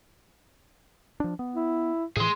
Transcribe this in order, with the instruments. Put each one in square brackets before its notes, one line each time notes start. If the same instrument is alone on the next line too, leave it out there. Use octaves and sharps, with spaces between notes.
[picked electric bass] F3 D4
B3
[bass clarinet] E4
[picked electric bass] A2 E3 [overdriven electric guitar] G#4 C6